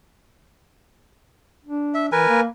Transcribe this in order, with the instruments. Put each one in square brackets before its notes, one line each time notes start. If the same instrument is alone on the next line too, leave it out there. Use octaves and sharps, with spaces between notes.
[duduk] D4
[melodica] E5
[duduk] E3 [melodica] A#4 B4 G#5
[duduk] A#3